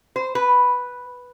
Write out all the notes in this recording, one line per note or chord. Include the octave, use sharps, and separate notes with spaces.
C5
B4